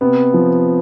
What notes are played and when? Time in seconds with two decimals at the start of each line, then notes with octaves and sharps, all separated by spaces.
0.01 C3 B3
0.34 F3